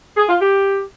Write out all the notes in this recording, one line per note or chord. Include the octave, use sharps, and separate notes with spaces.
G#4
F4
G4